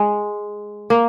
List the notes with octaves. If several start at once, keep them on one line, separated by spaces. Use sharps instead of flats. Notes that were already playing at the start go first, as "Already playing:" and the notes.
Already playing: G#3
A#3